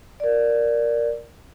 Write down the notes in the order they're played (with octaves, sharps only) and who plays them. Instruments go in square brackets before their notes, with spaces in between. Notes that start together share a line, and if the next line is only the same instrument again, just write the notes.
[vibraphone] A#4 D5